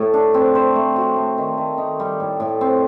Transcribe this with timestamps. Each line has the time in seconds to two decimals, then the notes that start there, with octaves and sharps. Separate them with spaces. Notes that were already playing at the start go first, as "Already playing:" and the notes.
Already playing: A2 A3
0.14 D4
0.34 C4
0.55 C5
0.75 A3
0.96 F#4
1.16 A3
1.38 D#3
1.58 D#3
1.78 D#4
2.00 G3
2.20 A2
2.40 A2
2.61 C4